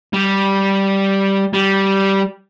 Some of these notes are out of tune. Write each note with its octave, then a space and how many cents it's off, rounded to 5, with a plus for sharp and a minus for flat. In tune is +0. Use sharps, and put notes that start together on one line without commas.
G3 -5
G3 -10